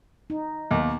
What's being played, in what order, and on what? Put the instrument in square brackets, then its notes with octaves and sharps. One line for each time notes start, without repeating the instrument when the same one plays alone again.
[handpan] D#4
[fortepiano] D#2 [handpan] A#3 B3